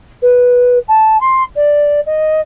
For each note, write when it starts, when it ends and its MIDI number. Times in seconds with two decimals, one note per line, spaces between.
0.22 0.78 71
0.88 1.19 81
1.20 1.43 84
1.55 2.00 74
2.05 2.40 75